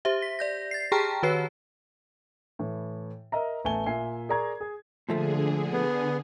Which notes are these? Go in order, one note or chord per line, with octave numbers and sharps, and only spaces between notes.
G4 C5 E5
B6
D5 G6 A#6
A6 C7
G4 G#4 G5 A5 A#5 F6
D#3 F#4 B4 C#5 C7
A2 E3
A#4 D#5 E5 A#5
A1 A3 B3 G#5 G7
A#2 E5 G#5 C7
G#4 A#4 D5 A#5 C#6 G#6
G#4
A#2 D3 F3 A3 G#4
B3